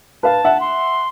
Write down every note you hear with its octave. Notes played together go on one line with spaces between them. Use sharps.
B4 F5 A5
E5 F#5
C6